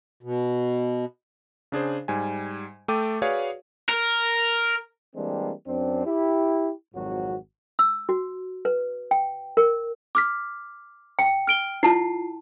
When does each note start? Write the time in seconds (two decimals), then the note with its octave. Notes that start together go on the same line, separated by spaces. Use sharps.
0.23 B2
1.72 C#3 D4 G#4 C5
2.08 G#2 G3 G#5
2.88 A3 A4 G5 D6 D#7
3.22 F#4 G#4 B4 C#5 D5 F5
3.89 A#4
5.16 E3 G3 G#3 A#3 C4 D4
5.67 F#2 C4 D4
6.06 E4 G4
6.95 G#1 F2 G#2 F#3 F#4
7.79 E6
8.09 F#4
8.65 B4
9.11 G5
9.57 A#4
10.15 D6 F6 B6
11.19 G5
11.47 F6 D7 G7
11.83 E4 F4 A5 C7